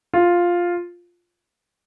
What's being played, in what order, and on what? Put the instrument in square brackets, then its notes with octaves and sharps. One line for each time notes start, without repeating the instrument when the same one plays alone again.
[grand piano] F4